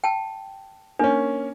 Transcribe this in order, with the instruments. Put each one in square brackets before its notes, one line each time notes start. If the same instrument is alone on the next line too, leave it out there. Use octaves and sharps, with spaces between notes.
[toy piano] G5 A5
[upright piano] A#3 C#4 [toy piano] D4